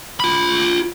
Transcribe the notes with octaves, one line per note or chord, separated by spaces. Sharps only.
F4 B5